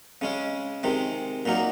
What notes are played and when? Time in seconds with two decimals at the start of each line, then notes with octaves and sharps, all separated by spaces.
0.21 C#3 G#3 C#4
0.83 C3 D#3 G#3
1.46 A#2 F#3 A#3 D#4